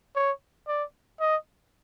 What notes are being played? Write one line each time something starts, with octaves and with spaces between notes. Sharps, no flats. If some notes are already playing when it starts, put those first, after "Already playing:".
C#5
D5
D#5